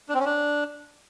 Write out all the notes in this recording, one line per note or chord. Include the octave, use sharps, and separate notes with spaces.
D4
C4
C#4
D4